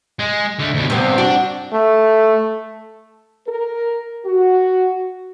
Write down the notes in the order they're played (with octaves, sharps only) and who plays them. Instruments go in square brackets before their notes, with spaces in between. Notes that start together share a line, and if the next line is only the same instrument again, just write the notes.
[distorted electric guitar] G#3
D3 A3
D2 B2
[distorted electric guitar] G2 [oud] C3 B3
[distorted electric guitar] D4 [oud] F#4
[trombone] A3
[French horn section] A#4
F#4